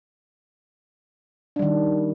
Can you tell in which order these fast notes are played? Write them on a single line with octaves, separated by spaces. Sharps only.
D4 G3 D#3